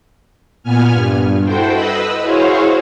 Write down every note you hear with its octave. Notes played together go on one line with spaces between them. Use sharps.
A#2 B3 G#5 F6
G2
E4 F#4 A4 C5 G5
B4 D#5 B5 E6
E4 F#4 G#4 C5 C#5 F5